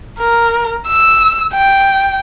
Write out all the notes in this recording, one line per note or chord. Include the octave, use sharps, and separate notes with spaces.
A#4
E6
G5